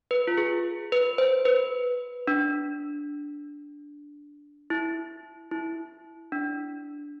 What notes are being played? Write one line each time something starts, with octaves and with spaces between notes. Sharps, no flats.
B4
F4
G#4
B4
C5
B4
D4
E4
E4
D4